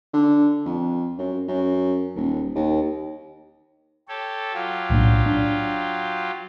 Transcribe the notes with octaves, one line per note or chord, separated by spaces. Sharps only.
D3
F2
F#2
F#2
D#1
D#2
G4 A4 C#5
F#3 F4 G4
B1 A2 D4
D4